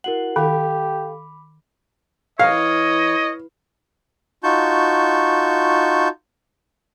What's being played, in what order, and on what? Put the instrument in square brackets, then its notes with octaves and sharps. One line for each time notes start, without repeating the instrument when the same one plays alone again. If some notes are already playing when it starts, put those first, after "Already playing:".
[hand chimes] E4 F#4 F#5 [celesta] A#4 F#7
[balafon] D#3 [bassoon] G4 [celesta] A4 F5 [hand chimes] B5 D6
[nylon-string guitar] E3 [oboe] C#5 [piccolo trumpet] D#5 [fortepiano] F5
[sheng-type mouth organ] D#4 F4 F#4 A5 C#6 G6